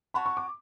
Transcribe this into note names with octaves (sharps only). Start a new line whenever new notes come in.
F#4 C#5 F#5 A5 B5
C#6
D6